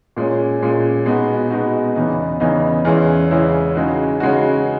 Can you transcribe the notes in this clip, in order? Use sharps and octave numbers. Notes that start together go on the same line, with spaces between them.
A#2 G#3 C#4
A#2 G#3 C#4
B2 G#3 B3 D#4 F#4
B2 G#3 B3 D#4 F#4
E2 C#3 E3 B3 D#4
E2 C#3 E3 B3 D#4
E2 C#3 G#3 C#4 E4
E2 C#3 G#3 C#4 E4
C#3 G#3 D#4 F#4
C#3 G#3 D#4 F#4